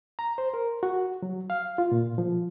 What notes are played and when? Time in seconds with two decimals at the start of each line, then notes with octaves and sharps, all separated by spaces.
0.19 A#5
0.38 C5
0.54 A#4
0.83 F#4
1.22 F#3
1.50 F5
1.78 F4
1.92 A#2
2.18 F3